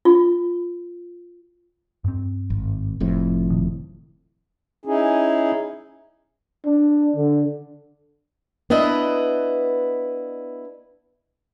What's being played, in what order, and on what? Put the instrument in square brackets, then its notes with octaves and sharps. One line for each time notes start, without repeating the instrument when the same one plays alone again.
[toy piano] F4
[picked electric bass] G2 C4
[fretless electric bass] G#1
F1 F2 A2
[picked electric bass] A#2 D#3
[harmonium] C#4 D#4 E4 G#4
[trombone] D4
D3
[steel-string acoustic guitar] B3 D4 E4 B4 D#5